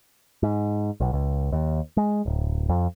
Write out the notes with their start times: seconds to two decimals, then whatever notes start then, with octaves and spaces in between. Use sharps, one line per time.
0.43 G#2
1.00 B1
1.13 C#2
1.52 D#2
1.97 G#3
2.26 D1
2.69 F2